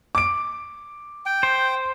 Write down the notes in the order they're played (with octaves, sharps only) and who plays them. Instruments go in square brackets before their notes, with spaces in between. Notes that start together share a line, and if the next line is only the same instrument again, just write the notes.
[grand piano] D6 D7
[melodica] G5
[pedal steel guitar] C5